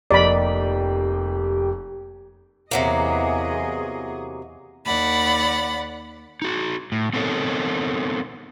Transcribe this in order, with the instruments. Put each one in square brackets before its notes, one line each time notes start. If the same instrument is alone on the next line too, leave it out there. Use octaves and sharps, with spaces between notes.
[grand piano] F1 A#3 D#5 [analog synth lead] G4 [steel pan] D5 B5
[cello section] E2 G#4 D#5 [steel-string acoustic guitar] C3 F#3 A#3
[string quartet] D#2 D5 F#5 B5
[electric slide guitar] D#4 F#4
A2
B3 C4 D#4 A4 A#4 C#5